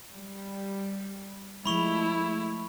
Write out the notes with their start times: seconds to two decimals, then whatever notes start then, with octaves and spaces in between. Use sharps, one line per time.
0.13 G3
1.66 F3 G#3 A3 E4 B5 C#6 F7